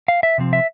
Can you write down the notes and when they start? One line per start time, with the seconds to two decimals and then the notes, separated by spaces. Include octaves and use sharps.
0.08 F5
0.23 E5
0.38 C3 F3 C4
0.53 E5